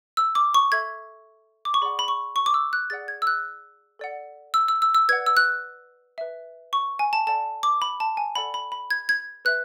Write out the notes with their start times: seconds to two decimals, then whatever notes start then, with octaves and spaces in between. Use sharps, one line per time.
0.17 E6
0.35 D6
0.54 C#6
0.72 A4 E5 G#6
1.65 D6
1.74 C#6
1.82 G#4 D5 F#5 B5
1.99 B5
2.08 C#6
2.36 C#6
2.46 D6
2.54 E6
2.73 F#6
2.90 G#4 D5 F#5 A6
3.08 G#6
3.22 E6
3.27 F#6
3.99 A4 D5 F#5
4.54 E6
4.68 E6
4.82 E6
4.95 E6
5.09 B4 D5 F#5 G#6
5.26 E6
5.37 F#6
6.18 B4 E5
6.73 C#6
6.99 G#5
7.13 A5
7.27 A4 D5 F#5 A5
7.63 D6
7.82 B5
8.00 A5
8.17 G#5
8.36 A4 D5 F#5 B5
8.54 B5
8.72 B5
8.91 G#6
9.09 G#6
9.45 B4 E5 F#6